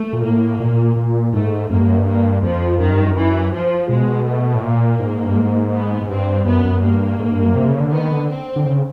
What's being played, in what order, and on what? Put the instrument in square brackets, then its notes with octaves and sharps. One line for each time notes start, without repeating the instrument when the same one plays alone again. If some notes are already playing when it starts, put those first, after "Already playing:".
Already playing: [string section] A3
[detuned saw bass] A#2
[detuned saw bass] A2 [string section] A#3
[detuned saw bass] A#2
A#2
[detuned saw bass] G#2 [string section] A3
[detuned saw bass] F#2 [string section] A#3
[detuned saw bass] G2
F#2
G2
[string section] A#3
[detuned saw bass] F2 [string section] F3
[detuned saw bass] F#2 [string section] D#3
[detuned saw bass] G2
F#2
[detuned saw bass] F#2 [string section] E3
[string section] F3
[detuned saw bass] B2 [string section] G#3
[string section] A3
[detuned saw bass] A2
[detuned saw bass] A#2 [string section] A#3
[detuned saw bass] G#2
G2
G#2
[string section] B3
[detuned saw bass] G#2
[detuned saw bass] G2 [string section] C4
[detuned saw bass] F#2 [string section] B3
[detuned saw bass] F#2
[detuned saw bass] G2 [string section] A#3
[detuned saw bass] G#2
G2
F#2
C3
C#3
D3
[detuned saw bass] D#3 [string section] B3
[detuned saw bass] D3
[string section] C4
[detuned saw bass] D3
C#3